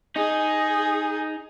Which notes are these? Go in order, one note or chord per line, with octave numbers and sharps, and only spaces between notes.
D#4 G#4